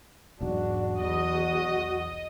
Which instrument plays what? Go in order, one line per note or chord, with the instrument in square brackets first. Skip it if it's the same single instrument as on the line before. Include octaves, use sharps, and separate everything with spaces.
[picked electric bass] E1 B1 [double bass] G#2 D4 [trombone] F#4
[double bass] E2 [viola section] D#5